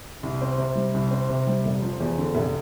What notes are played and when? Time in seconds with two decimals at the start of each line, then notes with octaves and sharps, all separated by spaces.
0.23 C2
0.41 C4
0.58 C3
0.75 G3
0.94 C2
1.11 C4
1.29 C3
1.47 G3
1.65 F1
1.82 F3
2.00 E2
2.18 D3
2.35 F1